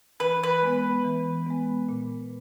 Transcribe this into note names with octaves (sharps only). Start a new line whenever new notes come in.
E3 B4
B4
G#3 B3
E3
G#3 B3
A#2